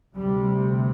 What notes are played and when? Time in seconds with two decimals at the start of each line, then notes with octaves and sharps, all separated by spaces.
0.15 D2 C3 G3